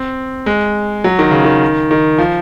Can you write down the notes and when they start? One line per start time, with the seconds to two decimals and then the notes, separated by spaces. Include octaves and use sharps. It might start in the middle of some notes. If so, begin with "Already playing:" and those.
Already playing: C4
0.46 G#3
1.04 F#3
1.19 D#3
1.31 C#3
1.44 D#3
1.91 D#3
2.18 F3